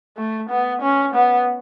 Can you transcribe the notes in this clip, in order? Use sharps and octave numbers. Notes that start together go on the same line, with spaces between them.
A3
B3
C#4
B3